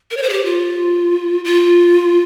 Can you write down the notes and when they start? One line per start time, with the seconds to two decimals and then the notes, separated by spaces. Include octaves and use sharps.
0.11 A#4
0.17 C#5
0.23 C5
0.29 G#4
0.33 G4
0.45 F4
1.45 F4